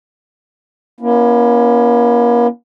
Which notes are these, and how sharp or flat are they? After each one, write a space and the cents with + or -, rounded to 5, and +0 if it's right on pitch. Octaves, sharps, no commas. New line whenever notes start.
A#3 +40 C#4 +10 E4 +10